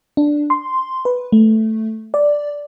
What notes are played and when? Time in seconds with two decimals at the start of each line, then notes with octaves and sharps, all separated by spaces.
0.17 D4
0.50 C6
1.05 B4
1.32 A3
2.14 D5